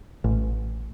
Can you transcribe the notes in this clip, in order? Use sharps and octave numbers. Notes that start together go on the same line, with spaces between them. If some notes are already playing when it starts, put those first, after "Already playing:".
A1